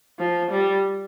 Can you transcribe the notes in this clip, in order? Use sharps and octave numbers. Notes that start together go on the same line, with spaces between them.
F3
G3